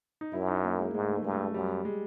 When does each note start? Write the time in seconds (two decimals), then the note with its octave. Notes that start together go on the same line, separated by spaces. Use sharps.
0.21 D#4
0.33 F#2 E4
0.48 D#4
0.63 A#3
0.79 G#3
0.94 G#2 G#3
1.02 A3
1.08 G#3
1.16 A3
1.23 G2 G#3
1.31 A3
1.37 G#3
1.54 F#2 G3
1.85 G#3